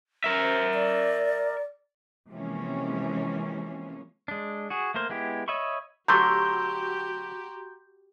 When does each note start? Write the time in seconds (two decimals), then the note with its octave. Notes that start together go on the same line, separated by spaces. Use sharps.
0.24 A#4 E5
0.40 C5
0.74 D5
2.29 C3 E3 F3 G#3 A#3 C#4
4.28 G#3 D4
4.70 F#4 G#4
4.94 A3 A#3 A#4 C5
5.10 G#3 B3 E4 G4
5.48 C#5 D#5 E5 B5 C#6
6.08 D3 F#3 A3 F#4 G4 A#5 C6 G6